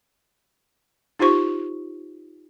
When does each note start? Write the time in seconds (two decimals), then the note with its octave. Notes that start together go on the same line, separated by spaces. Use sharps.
1.19 D#4 F4 G4 C5 C#6